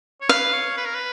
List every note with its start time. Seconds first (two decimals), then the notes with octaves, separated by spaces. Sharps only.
0.21 C#5
0.29 B4 F5
0.53 C#5
0.77 B4
0.85 A#4
0.94 B4